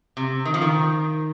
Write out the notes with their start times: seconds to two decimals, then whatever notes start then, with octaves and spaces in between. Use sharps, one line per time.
0.17 C3
0.45 D#3
0.54 F3
0.62 D#3